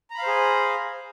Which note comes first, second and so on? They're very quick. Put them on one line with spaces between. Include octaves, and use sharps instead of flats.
A#5 B5 F5 C5 G#4